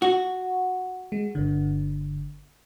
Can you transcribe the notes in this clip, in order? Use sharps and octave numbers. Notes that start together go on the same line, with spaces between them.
F#4
G#3
G1 D3